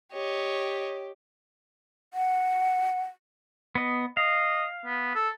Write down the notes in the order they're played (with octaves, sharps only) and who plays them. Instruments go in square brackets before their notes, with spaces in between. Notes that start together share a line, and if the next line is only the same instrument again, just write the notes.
[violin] G4 [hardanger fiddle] C#5 D#5
[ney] F#5
[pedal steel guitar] B3 D#5
[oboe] D#5 [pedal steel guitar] F5
[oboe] B3
A4